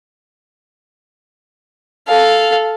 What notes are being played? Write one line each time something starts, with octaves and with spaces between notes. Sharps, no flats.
A4 F5